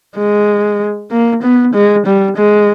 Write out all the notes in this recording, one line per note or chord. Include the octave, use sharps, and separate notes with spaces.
G#3
A#3
B3
G#3
G3
G#3